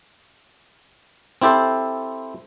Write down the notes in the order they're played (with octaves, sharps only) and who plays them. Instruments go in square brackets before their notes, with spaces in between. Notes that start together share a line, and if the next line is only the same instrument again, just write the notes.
[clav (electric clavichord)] C4 E4 G4 A4 C5